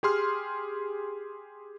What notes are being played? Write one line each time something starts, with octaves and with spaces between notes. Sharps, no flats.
G4 G#4 C6 F6